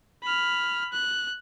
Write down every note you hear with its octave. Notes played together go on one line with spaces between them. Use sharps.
B5 F6
F#6